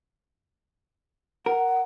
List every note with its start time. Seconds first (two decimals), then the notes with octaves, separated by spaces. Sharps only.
1.46 A#4 F#5